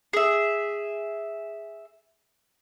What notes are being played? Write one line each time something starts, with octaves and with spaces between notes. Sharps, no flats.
G#4 E5